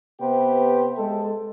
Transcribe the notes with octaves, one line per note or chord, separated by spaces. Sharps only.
C3 B3 G4 B4 C5
G#3 A4